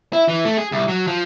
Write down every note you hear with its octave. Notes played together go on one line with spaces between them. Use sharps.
E4
E3
A3
G#4
C2
F#3
F3